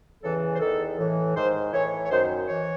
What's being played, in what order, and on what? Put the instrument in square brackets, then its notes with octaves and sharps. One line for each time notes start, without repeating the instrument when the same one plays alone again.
[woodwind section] E2 C#3 E3 A4
C5
E2 D#3 A4
A2 E3
G#2 D#3 C5
A2 E3 C#5
C#5
F#2 D#3 C5
E3 C#5